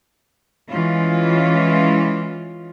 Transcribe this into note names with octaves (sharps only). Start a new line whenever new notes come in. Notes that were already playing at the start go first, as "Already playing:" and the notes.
E3 G#3 C#4 F4